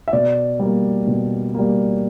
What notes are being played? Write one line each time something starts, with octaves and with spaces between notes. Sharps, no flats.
E5
B2 D5
G3 A#3
B2
G3 A#3